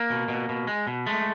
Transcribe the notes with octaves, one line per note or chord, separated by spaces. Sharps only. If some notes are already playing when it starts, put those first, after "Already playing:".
Already playing: A#3
B2
B2
B2
G#3
B2
G#3 A3